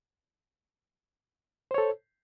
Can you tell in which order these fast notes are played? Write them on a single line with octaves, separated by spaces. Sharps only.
C5 C#5 A4